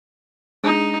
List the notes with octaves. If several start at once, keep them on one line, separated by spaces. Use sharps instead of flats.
G#3 D4 D#4 G#4